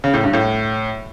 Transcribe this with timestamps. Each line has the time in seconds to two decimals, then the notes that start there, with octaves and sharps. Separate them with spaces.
0.04 C#3
0.14 A2
0.24 G2
0.34 A2